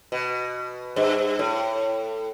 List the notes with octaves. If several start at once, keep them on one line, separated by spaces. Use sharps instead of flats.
B2
G2
A2